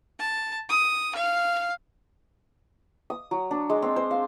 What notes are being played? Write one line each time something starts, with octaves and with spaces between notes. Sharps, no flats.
A5
D#6
F5
D#6
F#3
D4
G#3
C4
C5
F5